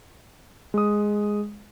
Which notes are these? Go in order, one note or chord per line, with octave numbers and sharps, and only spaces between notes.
G#3 D#6